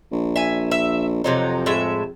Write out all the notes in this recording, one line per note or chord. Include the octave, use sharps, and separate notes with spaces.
A#1
E5 G#5
E5
F2 C3 F#3 D#4
A2 G#3 E5